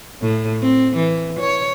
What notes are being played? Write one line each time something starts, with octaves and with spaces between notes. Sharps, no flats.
A2
C4
E3
C#5